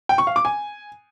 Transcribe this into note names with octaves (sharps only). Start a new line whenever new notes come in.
G5
C#6
F5
D6
G#5